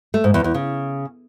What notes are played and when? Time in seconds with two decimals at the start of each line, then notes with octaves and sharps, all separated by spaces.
0.14 A3
0.24 G#2
0.34 E2
0.44 E2
0.55 C#3